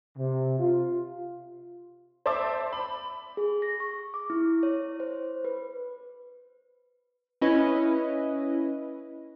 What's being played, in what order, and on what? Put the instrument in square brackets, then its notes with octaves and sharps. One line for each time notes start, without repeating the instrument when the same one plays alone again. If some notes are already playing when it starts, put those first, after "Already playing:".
[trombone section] C3
F4
[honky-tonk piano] C5 D5 E5 A5 C6 D6
B5
[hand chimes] G#4
A#6
C#6
D6
E4
C#5
C5
B4
[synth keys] C#4 E4 B4 D#5